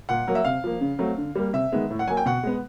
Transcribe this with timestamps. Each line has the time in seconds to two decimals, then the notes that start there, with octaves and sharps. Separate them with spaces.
0.09 A#2 F#5
0.27 F#3 A#3
0.35 E5
0.45 C3 F5
0.64 F3 A#3
0.81 C#3
0.99 F#3 A3 C4
1.18 D3
1.35 G3 A#3
1.53 C3 E5
1.72 D#3 G#3 B3
1.90 A2
1.99 F#5
2.08 F#3 A#3 G#5
2.17 G5
2.26 B2 F#5
2.43 G#3 B3